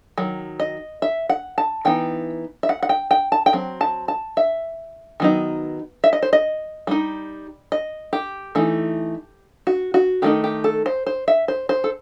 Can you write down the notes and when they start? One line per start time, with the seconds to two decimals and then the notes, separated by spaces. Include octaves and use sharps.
0.18 D#3 F#3
0.60 D#5
1.02 E5
1.29 F#5
1.58 A5
1.85 E3 B3 D#4 G5
2.63 E5
2.69 F#5
2.83 F#5
2.89 G5
3.11 G5
3.32 A5
3.46 G5
3.53 F#3 C4
3.81 A5
4.08 A5
4.37 E5
5.20 D#3 F#3 B3 D#4
6.04 E5
6.13 D#5
6.22 C5
6.33 D#5
6.87 G3 D#4
7.72 D#5
8.13 G4
8.55 E3 A3 D#4
9.67 F#4
9.94 F#4
10.22 D#3 A3 D#4 G4
10.44 G4
10.64 A4
10.86 C5
11.06 C5
11.28 E5
11.48 C5
11.69 C5
11.84 A4